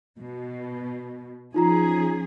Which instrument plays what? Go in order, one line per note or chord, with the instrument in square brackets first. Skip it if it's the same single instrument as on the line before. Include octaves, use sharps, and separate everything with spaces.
[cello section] B2
[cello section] F3 C#4 G#4 [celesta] D#4 F4 A#5